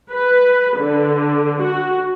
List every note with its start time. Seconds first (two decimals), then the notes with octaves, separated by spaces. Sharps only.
0.11 B4
0.78 D3
1.62 F#4